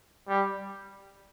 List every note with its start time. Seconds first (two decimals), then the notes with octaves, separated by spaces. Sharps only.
0.28 G3